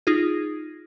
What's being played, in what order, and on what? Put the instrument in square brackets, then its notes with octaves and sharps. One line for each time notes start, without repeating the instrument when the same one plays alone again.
[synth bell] D#4 F4 G#4